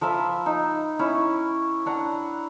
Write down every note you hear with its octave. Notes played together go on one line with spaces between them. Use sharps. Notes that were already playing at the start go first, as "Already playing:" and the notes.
F3 A#4 E5 B5
D#4
C#4 E4
D4 F#5 A#5